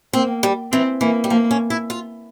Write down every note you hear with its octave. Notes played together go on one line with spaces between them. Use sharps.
A#3 C4
G3
E3 C4
E3 A#3
G3
F3 A#3
C#4
E4
F4